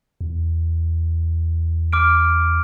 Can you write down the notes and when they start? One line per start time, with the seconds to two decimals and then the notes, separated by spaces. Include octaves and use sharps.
0.21 E2
1.93 D6 F6 D7